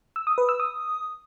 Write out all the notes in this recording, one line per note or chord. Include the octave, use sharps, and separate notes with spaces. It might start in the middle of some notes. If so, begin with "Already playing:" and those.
E6
D#6
B4
E6
D#6